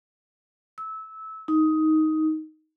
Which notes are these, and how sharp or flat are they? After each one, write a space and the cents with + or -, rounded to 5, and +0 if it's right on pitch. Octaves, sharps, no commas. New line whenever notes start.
E6 -20
D#4 +10